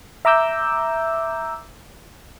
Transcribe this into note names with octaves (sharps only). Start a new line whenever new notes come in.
E5 A#5 D6 E6 G6